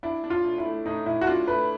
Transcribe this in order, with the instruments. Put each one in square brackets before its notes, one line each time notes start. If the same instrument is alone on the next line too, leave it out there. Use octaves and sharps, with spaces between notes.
[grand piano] D4 [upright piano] E4
[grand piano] D4
[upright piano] F4
[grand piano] A2
[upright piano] E4
[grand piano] A3
[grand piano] A2 [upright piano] D#4
[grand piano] A2 [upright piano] E4
[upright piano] F#4
[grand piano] D4 [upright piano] F4
[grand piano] A3 [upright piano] B4